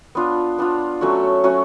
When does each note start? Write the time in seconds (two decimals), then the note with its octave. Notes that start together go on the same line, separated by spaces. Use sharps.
0.15 B3 D4 F4
0.59 B3 D4 F4
1.01 F#3 A3 C#4 F#4
1.44 F#3 A3 C#4 F#4